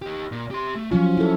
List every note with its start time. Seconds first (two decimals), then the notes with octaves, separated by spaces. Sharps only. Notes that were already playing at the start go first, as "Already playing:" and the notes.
0.02 D#4 G4
0.32 A#2
0.51 G4 C6
0.75 A3
0.91 F3 F#3 C#4 F4
1.17 E4 A4